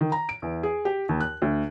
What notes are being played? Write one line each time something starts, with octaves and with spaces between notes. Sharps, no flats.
D#3
A#5
D7
E2
G#4
G4
D#2
F#6
D2